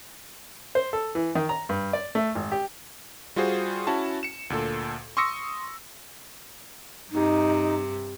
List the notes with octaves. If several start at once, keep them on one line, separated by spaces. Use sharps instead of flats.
C5
A4
E3
D#3
A#5
G2
D5
A3
G#1
G4
G3 F4 F#4 G#4 C5
C#4 E4 F#4 A5
C#7 E7
D2 A#2 A4
C6 C#6 D#6 E6 A#6 C#7
G2 C3 D#4